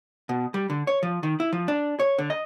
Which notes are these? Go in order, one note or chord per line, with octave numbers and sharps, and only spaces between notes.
B2
G3
D3
C#5
F3
D#3
E4
F3
D4
C#5
D3
D#5